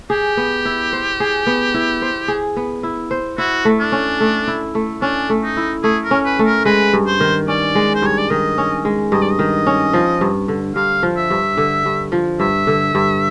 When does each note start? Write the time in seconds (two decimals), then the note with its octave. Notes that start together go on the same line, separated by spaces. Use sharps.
0.10 G4 G#4
0.37 B3
0.65 E4
0.93 C5
1.20 G#4
1.47 B3
1.74 E4
2.02 C5
2.28 G#4
2.56 B3
2.83 E4
3.11 C5
3.38 E4 F#4
3.65 A3
3.80 D4
3.92 C#4
4.20 A3
4.47 E4
4.75 A3
5.02 C#4 D4
5.30 A3
5.44 D#4
5.57 E4
5.83 A3 G#4
6.04 A#4
6.11 C#4
6.25 B4
6.39 A3
6.46 A#4
6.65 G#3 B4
6.93 G2
7.07 C5
7.20 D#3
7.48 C#4 D5
7.75 G#3
7.95 C5
8.02 G2 C#5
8.18 D5
8.30 D#3 D#5
8.58 C#4
8.85 G#3
9.12 G2 D#5
9.22 D5
9.31 D#5
9.39 D#3
9.66 C#4
9.93 F3
10.21 G2
10.48 D3
10.76 G2 F5
11.03 F3
11.17 E5
11.30 G2
11.57 D3
11.85 G2
12.12 F3
12.40 G2 E5
12.67 D3
12.95 G2